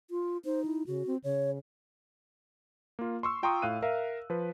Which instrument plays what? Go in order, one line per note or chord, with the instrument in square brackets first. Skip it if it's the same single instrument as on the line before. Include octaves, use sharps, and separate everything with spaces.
[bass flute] F4
[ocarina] D#4 [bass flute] C5
[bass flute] E4
[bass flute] C#3 [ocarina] F#4
[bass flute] C4
[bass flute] C#3 [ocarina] C#5
[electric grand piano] A#3 F4
C6 C#6 E6
F4 G5 A#5 C6 C#6 D#6
A2 F5 F#6 D#7
A#4 E5 F5
F3 B4